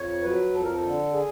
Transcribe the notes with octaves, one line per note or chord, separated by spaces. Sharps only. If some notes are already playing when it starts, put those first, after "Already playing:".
Already playing: F2 C#5
F#3 B4
F2 A4
A#4
A4
D3
G#4